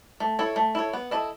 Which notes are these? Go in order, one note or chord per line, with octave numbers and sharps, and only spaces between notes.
A3
E4 A4 C#5
A3
E4 A4 C#5
B3
E4 A4 D#5